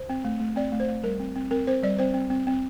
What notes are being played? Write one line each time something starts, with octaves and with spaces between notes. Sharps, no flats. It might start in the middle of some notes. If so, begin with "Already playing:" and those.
Already playing: C5
C4
A3
A3
C4 D5
A3
C5
A3
G3 A#4
C4
C4
C4 A#4
C4 C5
G3 D5
C4 C5
C4
C4
C4